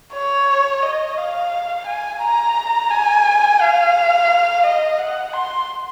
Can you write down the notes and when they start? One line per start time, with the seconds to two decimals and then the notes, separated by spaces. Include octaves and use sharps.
0.13 C#5
0.83 D#5
1.18 F5
1.87 G#5
2.22 A#5
2.91 G#5
3.61 F5
4.64 D#5
4.98 F#5
5.33 C6